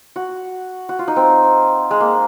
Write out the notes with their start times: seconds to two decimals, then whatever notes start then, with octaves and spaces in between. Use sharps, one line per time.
0.16 F#4
0.89 F#4
0.99 F4
1.08 D#4
1.16 C4
1.91 G#3
2.00 A#3